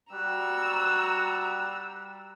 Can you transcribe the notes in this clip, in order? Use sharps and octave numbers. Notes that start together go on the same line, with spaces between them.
G3 F#4 A#5 E6 F#6